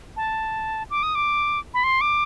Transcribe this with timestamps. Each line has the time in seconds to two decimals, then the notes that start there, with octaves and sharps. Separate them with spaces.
0.17 A5
0.90 D6
1.03 D#6
1.15 D6
1.74 B5
1.84 C6
2.01 D6